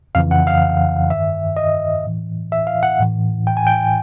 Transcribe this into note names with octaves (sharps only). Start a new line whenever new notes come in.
F2 C#3 E3 F5
F#5
F5
G2 D#3 E5
D#5
A2 E3
E5
F5
F#5
A2 E3
G5
G#5
G5